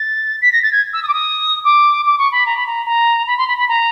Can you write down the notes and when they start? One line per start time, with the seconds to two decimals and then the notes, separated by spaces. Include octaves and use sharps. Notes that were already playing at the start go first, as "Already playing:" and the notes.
Already playing: A6
0.42 B6
0.52 A#6
0.63 A6
0.72 G#6
0.93 E6
1.03 D#6
1.08 D6
1.13 D#6
1.64 D6
2.06 D6
2.18 C#6
2.32 B5
2.46 A#5
2.57 B5
2.66 A#5
2.86 A#5
3.27 B5
3.38 C6
3.47 B5
3.57 B5
3.68 A#5